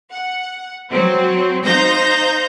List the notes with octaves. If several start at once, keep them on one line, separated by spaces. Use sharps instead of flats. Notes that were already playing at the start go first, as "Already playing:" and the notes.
F#5
F#3 C4
D#4 C5 F5 G6 A#6